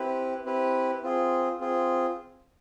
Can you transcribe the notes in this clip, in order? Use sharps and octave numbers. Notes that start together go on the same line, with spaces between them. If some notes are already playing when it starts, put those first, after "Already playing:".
Already playing: C4 E4 G4 B4
C4 E4 G4 B4
C4 F4 G#4
C4 F4 G#4